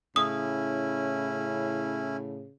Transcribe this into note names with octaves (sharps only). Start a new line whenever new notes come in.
A2 C#3 C#4 E4 D#6